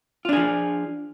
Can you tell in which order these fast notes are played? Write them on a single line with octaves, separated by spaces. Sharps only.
F4 D4 G#4 F3